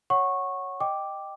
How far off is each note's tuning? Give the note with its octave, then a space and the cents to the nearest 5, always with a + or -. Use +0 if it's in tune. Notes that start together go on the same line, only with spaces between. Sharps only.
C#5 +0 F#5 +0 C#6 -15
D#5 -10 G5 +0 D6 +0